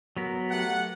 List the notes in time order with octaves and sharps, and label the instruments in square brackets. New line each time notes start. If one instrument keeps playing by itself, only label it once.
[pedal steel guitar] F#3 B3 A#4
[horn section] A3 G4 F#5